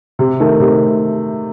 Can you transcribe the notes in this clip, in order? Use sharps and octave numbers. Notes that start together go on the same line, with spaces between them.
C3
D#3 A3
C3